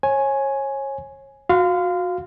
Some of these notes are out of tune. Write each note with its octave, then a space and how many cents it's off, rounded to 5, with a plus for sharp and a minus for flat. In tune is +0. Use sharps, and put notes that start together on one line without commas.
C#5 -30 G#5 +5
F#4 -25 F5 +0 C6 -35